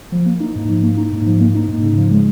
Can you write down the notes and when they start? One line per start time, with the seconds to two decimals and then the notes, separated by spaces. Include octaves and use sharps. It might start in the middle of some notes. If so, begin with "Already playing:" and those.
0.12 F3
0.26 A#3
0.40 D#4
0.55 G#2
0.69 F3
0.82 A#3
0.97 D#4
1.12 G#2
1.26 F3
1.40 A#3
1.55 D#4
1.68 G#2
1.82 C#3
1.97 F3
2.11 G#3